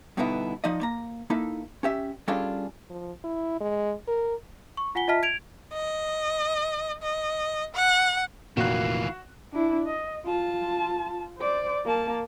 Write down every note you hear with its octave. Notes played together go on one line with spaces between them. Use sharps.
G2 B2 D3 B3 D#4 E4
F3 D#4 D5 D#5
A#3 A#5
A#3 D#4 E4 A4
C#4 G4 E5
G3 C#4 D4 F4 G#4 A4
F3
E4
G#3
A#4
C#6
F4 F#5 G#5 B6 G7
F4 D#5 E5 A5 F6 B6
G#6 D7 F7
D#5
D#5
F#5
F1 A#2 D#3 E3 A#3 F#4 F5 F#6
D4 E4
D#5
F4 A5
C5 D5
A#3 A5